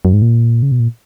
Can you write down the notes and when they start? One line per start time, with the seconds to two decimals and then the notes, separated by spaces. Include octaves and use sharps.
0.05 F#2
0.13 G#2
0.22 A#2
0.62 C#3
0.72 B2
0.80 A#2